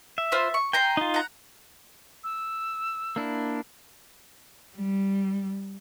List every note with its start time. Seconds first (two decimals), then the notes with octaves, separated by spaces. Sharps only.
0.18 E5
0.32 F4 C5 B5
0.54 C#6
0.73 G5 G#5 A#5 C6
0.97 D#4 F4
1.14 F#5 A#5
2.24 E6
3.16 A#3 D4 E4
4.77 G3